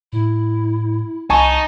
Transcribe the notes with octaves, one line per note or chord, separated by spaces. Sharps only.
A2 E4
C2 D#4 G#5 A5 C#6